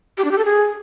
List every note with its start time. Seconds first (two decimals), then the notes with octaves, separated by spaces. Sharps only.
0.18 G4
0.24 D4
0.31 G4
0.38 A4
0.45 G#4